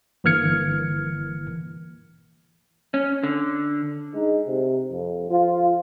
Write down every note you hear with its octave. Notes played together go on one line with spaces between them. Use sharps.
G1 E3 A#3 F6 G#6 C#7
C#4
D3
G#3 D#4
C3
F2
F3 F4